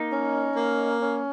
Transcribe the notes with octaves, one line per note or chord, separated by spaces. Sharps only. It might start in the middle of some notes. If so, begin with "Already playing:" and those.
Already playing: A#3 D#4
C#4
A#3
C#4